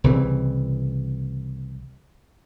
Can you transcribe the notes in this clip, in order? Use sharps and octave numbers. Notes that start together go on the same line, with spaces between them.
C2 C#3 E3 C4